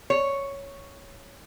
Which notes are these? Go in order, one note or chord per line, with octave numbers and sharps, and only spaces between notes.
C#5